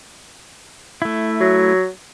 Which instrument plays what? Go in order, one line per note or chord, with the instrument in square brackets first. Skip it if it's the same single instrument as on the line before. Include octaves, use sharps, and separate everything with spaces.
[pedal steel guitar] A3 E4
[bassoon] F#3